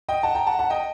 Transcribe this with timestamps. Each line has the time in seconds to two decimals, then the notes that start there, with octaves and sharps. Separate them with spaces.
0.09 D#5 G5
0.23 F#5 A5
0.35 G5 A#5
0.47 F#5 A5
0.59 F#5 A5
0.70 D#5 G5